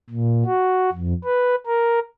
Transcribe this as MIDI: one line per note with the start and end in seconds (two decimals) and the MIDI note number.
0.10 0.44 46
0.46 0.90 66
0.92 1.13 41
1.24 1.55 71
1.67 2.00 70